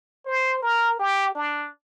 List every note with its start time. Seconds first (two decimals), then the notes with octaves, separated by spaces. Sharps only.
0.26 C5
0.62 A#4
0.99 G4
1.35 D4